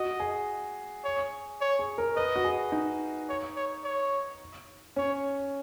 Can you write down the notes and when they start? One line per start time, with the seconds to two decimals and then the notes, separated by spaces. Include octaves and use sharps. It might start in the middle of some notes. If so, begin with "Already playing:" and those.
Already playing: F#4 D#5
0.20 G#4
1.04 C#5
1.61 C#5
1.79 G#4
1.98 A#4
2.16 B4 D#5
2.36 F#4
2.44 G#4
2.72 D#4
3.29 C#5
3.56 C#5
3.84 C#5
4.96 C#4 C#5